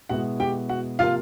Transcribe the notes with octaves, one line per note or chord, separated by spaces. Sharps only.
B2 G#3 B3 E4 F#4 F#5
G4 G5
F#4 F#5
C3 F3 A#3 F4 F5